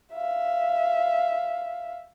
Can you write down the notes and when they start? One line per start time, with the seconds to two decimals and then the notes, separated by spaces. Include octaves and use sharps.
0.13 E5 F5